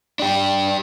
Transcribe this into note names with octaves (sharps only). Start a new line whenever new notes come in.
D4 G4